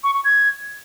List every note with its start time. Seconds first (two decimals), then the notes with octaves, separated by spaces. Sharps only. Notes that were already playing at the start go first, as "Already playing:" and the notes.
0.04 C#6
0.14 C#6
0.25 G#6